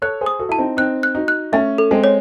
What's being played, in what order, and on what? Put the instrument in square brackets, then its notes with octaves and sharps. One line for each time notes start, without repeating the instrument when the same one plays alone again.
[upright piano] A4 C#5 [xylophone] F#6
[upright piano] G#4 C5
[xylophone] D#6
[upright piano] F#4 A4
[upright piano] E4 [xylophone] A5
[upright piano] C4 D#4
[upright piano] C4 D#4 [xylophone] F#6
[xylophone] F#6
[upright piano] D#4 F#4
[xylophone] F#6
[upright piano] A3 C#4 [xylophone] E5
[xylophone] A4
[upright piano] G#3 C4
[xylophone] C#5